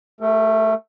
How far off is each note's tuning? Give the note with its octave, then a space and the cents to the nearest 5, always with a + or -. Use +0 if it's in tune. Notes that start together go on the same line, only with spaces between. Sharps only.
A3 +0 G4 +35 A#4 -40